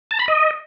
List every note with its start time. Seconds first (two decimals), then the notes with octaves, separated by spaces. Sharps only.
0.11 A5
0.19 B5
0.28 D#5